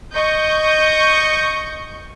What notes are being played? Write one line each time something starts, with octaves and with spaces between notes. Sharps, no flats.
D#5 C#6 G6